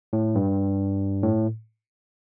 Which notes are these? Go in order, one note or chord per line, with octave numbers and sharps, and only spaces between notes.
A2
G2
A2